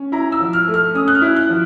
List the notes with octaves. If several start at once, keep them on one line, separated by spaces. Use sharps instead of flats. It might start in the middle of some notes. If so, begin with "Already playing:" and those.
Already playing: C#4
E4 A#5
E6
F3
F6
A3
F6
C#4 D#6
F#6
F6
E4
F#6
F3